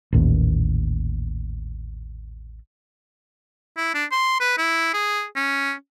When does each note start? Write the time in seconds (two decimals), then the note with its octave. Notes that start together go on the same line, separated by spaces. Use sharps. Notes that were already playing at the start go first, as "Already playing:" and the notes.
0.13 A1 D#2 A#2
3.77 E4
3.94 D4
4.11 C6
4.40 B4
4.58 E4
4.93 G#4
5.36 C#4